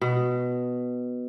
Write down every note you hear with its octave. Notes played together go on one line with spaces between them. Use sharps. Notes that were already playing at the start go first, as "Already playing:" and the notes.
B2